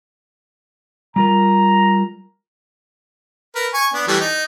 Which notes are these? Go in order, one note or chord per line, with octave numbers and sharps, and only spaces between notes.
G3 F4 A#4 A#5
A#4 B4
G#5 C#6
B3 D4
E3 G3 A3
D#4